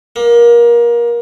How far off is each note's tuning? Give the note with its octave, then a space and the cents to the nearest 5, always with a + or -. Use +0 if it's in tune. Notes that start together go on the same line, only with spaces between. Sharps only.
A#3 +25